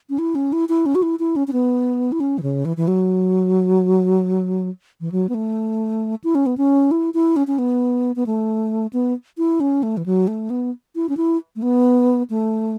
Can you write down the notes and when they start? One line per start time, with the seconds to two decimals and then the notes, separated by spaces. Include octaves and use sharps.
0.10 C#4
0.18 E4
0.35 C#4
0.53 E4
0.69 E4
0.86 C#4
0.95 F#4
1.02 E4
1.19 E4
1.36 C#4
1.47 C#4
1.53 B3
2.12 E4
2.20 C#4
2.38 E3
2.43 C#3
2.65 E3
2.77 E3
2.88 F#3
5.01 E3
5.12 F#3
5.29 B3
5.34 A3
6.24 E4
6.35 C#4
6.46 B3
6.57 C#4
6.91 E4
7.14 E4
7.36 C#4
7.47 C#4
7.58 B3
8.16 B3
8.26 A3
8.93 B3
9.38 E4
9.60 C#4
9.83 A3
9.97 E3
10.06 F#3
10.28 A3
10.50 B3
10.96 E4
11.09 C#4
11.17 E4
11.56 A3
11.62 B3
12.30 A3